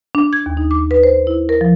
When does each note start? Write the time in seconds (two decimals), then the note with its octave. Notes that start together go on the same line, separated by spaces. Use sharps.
0.15 D4
0.33 G#6
0.46 D#2
0.57 D#4
0.71 D6
0.91 B4
1.03 C5
1.27 E4
1.49 A#4
1.61 F3